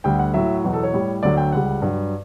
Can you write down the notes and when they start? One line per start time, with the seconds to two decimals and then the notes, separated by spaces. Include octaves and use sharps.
0.04 D2 D3 G3 G5
0.19 F#5
0.34 A2 F#3 E5
0.64 E2 B2 F#3
0.74 A4
0.83 C#5
0.94 A2 G3
1.23 D2 D3 F#3 D5
1.37 G5
1.52 C#2 C#3 G3 F#5
1.82 G2 F#3